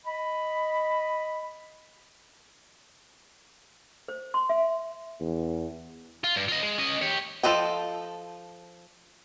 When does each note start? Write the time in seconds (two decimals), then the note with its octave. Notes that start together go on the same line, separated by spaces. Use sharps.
0.05 D#5 B5
4.08 C5
4.34 C6
4.49 E5
5.20 E2
6.24 F4
6.36 G2
6.48 F4 D#5
6.63 G#3
6.78 C#4 D#5
7.02 G4 C#5
7.43 F3 A4 D#5 G5